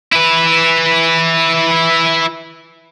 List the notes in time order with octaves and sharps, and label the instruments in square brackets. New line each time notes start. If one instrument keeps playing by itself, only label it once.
[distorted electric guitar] E4 B4